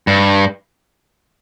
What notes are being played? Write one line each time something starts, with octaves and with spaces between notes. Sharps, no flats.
G2